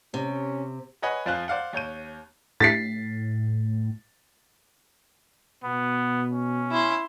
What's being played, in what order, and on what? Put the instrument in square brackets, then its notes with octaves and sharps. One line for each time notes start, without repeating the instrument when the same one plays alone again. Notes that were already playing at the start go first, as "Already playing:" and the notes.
[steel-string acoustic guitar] C3 [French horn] C#4
[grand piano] B4 C#5 D#5 F#5 G#5 B5
F2 F3 F4 C5 G#5 F#6
C5 D5 F5 F#5
D#2 C#5 G6 D#7
[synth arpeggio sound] A2 [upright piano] A6 B6 C7
[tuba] B2 [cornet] B3
[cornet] C#4
[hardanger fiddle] E4 C6